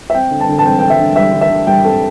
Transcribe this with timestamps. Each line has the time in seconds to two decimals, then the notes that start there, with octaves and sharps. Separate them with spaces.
0.10 E5
0.14 C4 G5
0.31 D3
0.40 A5
0.49 D3
0.58 A5
0.65 C4 G5
0.79 D3 G5
0.90 E5
0.99 D3
1.16 G3 E5
1.33 D3
1.41 E5
1.50 D3
1.67 G3 G5
1.84 C4 A4